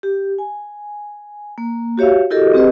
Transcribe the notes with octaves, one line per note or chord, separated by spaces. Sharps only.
G4
G#5
A#3
F#4 G4 C#5 E5 F5
E4 F#4 G4 A4 A#4 D#5
C4 G4 G#4 B4 D#5